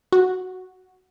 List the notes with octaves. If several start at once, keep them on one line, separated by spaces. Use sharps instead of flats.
F#4